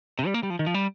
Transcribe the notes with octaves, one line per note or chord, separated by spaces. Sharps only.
C3
G3
A#3
G3
F3
D#3
F3
G3